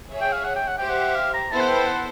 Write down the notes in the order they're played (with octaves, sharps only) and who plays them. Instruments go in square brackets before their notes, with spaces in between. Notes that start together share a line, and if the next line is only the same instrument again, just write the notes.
[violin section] G#4 C#5 E5
[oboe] G5
F5
F#5
G5
F#5
[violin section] G4 C5 E5 [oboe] G5
[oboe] F#5
F5
A#5
[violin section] B3 E4 A4 C5 [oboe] A5
[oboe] F#5
G5
F#5